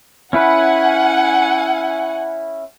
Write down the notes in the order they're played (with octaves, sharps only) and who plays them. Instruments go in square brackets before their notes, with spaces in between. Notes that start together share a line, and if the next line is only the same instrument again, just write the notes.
[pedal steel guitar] C#4 E4 B4 [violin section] F#5 G#5